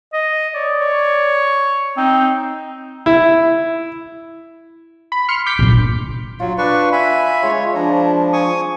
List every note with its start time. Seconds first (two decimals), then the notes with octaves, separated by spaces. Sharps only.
0.13 D#5
0.55 C#5 D5
0.81 C#5
1.97 C4 D#4
3.06 E4
5.12 B5
5.28 C6 F6 C#7
5.46 D6 G6 B6
5.59 A#2 D4
6.40 F#3 F4
6.58 D4 B4 C#6
6.92 E5 G#5 B5
7.43 G#3 F4 C#5
7.75 F3 D4 A#5
8.33 G#5 C#6 D#6